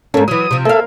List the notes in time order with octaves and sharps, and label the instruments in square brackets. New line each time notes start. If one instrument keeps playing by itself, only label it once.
[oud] G#2 A#3 [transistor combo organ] C#4 A4
[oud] E3 F#3 [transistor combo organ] D#6
[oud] C3 F3
[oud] A#3 F5 [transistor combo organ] A4 E5